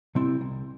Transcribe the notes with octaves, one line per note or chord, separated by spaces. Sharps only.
C3 G3 C4 E4
C2